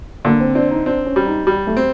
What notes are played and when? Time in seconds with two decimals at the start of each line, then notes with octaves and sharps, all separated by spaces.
0.25 D3 A#3
0.40 C4
0.55 C4 D4
0.71 D#4
0.86 C4 D4
1.06 C#4
1.16 G3
1.26 D#4
1.47 G3
1.67 A3
1.77 C4